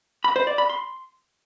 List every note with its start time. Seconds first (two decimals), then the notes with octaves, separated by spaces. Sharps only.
0.24 B5
0.36 C5
0.47 D5
0.58 B5
0.70 C6